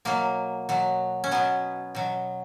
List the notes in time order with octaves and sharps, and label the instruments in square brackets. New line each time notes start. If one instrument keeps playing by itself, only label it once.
[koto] B2 F#3 A#3
B2 F#3
C#4
B2 F#3 B3
B2 F#3